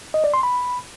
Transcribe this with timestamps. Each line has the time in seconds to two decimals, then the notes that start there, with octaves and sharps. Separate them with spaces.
0.14 D#5
0.24 D5
0.34 C6
0.43 B5